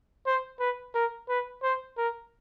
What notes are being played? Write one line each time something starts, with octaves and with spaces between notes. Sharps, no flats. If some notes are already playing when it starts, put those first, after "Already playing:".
C5
B4
A#4
B4
C5
A#4